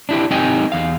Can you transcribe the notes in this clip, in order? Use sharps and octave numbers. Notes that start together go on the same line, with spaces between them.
D4 E4 G4
C4 D#4 G4 D#5 G5 G#5
E2 F5